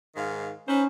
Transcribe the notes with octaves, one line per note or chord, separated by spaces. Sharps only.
G#2 D#3 F5
C#4 D#4 B4 C5